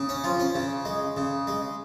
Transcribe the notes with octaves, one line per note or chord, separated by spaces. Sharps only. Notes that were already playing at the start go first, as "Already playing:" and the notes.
Already playing: C#3
C#4
F3 F4
C#4
C#3
G#3
C#3
G#3